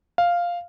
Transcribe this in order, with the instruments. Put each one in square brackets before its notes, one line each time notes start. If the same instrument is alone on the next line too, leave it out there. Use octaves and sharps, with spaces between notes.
[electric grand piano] F5